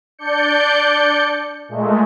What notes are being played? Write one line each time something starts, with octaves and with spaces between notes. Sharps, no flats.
D4 D5 G6 C#7
A#2 G#3 A3